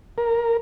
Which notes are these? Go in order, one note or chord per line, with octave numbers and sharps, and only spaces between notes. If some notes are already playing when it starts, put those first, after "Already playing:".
A#4